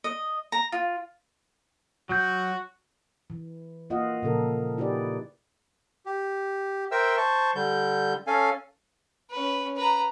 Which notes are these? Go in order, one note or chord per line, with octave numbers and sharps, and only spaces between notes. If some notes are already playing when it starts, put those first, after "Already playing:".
D#5
A#5
F4
F#3 F#4 G6
E3
A#3 F4 D#5 F5 F#5
A#2 C#3 F3 A4 A#4
D#4 E4 G4 G#4 B4 D5
G4
A#4 C5 E5 G5 E6
C5 A5 C#6
D3 G3 G6
C#4 A4 F5 G#5
C#4 B4
B4 A#5